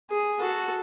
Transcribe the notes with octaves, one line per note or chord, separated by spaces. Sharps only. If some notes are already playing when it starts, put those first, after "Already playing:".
G#4
F#4 A4